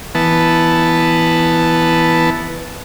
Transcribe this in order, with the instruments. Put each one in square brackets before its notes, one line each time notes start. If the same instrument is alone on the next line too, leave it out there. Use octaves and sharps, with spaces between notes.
[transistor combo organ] E3 B3 A5